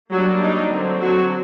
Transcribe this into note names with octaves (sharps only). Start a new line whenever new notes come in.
F#3 G3 A#3 D4 F#4
D#4
D3 F#3 C4
F#3 F#4